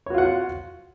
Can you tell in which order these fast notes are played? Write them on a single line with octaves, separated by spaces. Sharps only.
C#5 F#4 F4 F#5